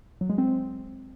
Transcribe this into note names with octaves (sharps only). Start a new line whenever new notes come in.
F#3
G#3
C4